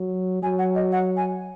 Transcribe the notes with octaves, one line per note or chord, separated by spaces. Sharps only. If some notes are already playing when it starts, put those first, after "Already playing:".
Already playing: F#3
F#3 G#5
F#5
D#5
F#5
G#5